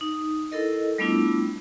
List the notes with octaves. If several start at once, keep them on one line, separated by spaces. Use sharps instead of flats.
D#4
E4 A4 A#4 D#5
G3 A3 B3 D4 E4 F4